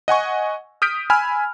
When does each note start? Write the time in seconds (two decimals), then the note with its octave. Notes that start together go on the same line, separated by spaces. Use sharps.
0.08 D#5 F#5 G#5 C#6
0.82 D#6 F6 G6 B6 D7
1.10 G#5 B5 E6 F6